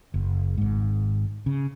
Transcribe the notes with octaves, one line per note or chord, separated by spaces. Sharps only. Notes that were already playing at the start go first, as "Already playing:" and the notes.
F#1
G#1 G#2
C#3